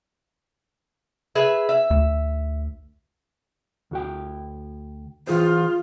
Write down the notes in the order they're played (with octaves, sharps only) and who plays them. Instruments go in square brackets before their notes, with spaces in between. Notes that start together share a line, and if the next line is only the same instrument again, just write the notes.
[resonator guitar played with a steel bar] G#4 B4 E5
E5
[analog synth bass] D2
[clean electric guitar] D2 F#4 G5
[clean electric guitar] E3 G#4 C5 [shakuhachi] F4